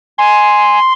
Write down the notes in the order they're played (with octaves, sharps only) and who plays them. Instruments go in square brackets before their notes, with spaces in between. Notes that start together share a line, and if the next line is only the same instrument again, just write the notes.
[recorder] G#5 [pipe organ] C6